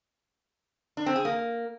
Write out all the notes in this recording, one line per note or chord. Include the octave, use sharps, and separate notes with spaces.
D4
C4
G#4
A#3